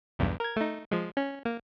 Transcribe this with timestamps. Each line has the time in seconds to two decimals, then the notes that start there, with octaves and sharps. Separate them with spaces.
0.19 B1 E2 G2
0.40 A#4 G#6
0.56 A3 D#4
0.91 F3 G#3
1.17 C#4
1.45 A#3